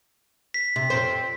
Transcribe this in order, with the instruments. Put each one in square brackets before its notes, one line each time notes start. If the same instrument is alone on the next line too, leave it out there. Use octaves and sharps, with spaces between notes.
[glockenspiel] B6
[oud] C3
F2 C4 C5